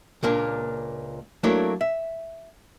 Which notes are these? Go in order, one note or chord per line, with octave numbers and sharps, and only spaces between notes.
C#2 A#2 A#3 D4
F#3 A3 A#3 D4 E4 C#5
E5